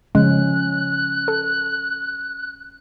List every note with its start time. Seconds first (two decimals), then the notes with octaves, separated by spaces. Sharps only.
0.15 C#3 F3 G#3 C#4 F#6
1.28 A4